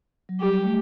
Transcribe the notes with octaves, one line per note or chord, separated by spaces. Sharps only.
F#3
G3 G4
A3